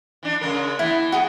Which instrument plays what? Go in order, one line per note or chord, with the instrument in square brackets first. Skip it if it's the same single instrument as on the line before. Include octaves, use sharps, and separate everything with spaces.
[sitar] E3 D4
C#3 G#3 A#4
[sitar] E3 B3 [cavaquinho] E4
[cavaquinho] F#4 G#4